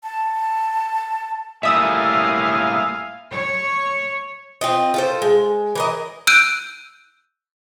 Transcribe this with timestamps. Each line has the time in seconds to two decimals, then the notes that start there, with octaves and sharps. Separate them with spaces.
0.03 A5
1.63 A2 G3 A#3 E5 F5 G#5 D#6 E6
3.30 C#5
4.61 C4 F4 D#5
4.94 F4 A4 C5
5.22 G#3
5.75 E3 A#4 D#5
6.27 E6 F#6 G6 D7 D#7